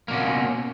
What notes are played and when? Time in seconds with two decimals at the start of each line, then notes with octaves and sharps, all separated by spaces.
0.08 A#3
0.11 B2
0.13 C#4